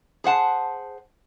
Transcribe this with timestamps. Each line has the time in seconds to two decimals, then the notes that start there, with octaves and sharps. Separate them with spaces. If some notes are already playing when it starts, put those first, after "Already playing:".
0.24 G#4 C5 F#5 A5